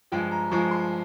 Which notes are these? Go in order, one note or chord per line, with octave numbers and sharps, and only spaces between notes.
G2 F3 G#3 G5
A#5
G2 F3 G#3 C#6
C6